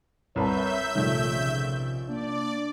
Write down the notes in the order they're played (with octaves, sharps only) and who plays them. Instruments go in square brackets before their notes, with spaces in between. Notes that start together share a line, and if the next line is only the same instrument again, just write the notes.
[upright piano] C2 B4 A5 [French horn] C#5 [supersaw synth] E5 G6 [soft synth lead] A#5
[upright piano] A#1 D#3 [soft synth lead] C3 [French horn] A3
[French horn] C#3
[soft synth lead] A#3 [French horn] D4 [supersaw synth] D5